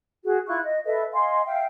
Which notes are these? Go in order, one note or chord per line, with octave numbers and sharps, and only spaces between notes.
F#4 G#4
E4 F4 C#6 F#6
D#5
A4 B4 D#5 E5
D#5 F5 G#5 C6
E5 F5 G5